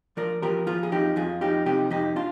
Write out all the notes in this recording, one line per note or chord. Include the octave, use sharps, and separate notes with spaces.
F3 A#4 D5
F3 G4 A#4
F3 F4 G#4
G#4
F2 D#4 G4
F2 F4 G#4
F3 D#4 G4
C3 D#4 G4
F2 D#4 G4
D4 F4